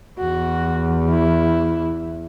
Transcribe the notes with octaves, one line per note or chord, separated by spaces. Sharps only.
E2 F#4
E4